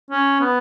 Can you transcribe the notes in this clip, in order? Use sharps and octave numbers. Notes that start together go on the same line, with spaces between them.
C#4
B3